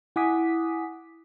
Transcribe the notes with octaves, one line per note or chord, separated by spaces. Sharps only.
E4 F#5 G#5 D6 D#6 B6